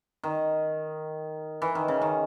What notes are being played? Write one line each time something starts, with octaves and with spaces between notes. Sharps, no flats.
D#3
E3
D#3
C#3
D#3